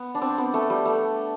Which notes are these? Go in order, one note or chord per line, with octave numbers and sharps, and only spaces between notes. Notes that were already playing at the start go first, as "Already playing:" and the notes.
Already playing: B3
D4
C4
B3
A3
G3
A3